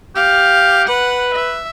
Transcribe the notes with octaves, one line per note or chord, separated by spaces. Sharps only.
G4 F5
B4 F#5
E5